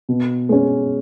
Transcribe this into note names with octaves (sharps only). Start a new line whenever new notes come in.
B2
G#3 C#4